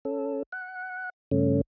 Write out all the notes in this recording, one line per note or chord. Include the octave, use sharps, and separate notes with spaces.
C#4 A4
F#5
G2 C#3 A3 C#4